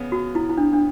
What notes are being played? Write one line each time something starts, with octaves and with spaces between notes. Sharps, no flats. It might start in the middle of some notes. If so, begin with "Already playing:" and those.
Already playing: C#3 B3
F#4
E4
E4
D4
D4